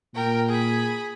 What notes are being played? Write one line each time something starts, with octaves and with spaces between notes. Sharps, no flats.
A#2 A#4 G5
G#4 B5